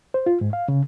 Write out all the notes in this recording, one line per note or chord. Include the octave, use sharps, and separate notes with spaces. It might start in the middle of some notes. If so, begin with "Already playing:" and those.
C5
F4
G#2
F5
C#3